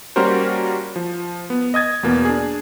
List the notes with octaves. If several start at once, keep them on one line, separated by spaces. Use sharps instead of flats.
G3 A#3 C#4 F#4 A#4 C5
F3
B3
D#5 D#6 G#6 A6
E2 B2 A#3 B3
D4 G#4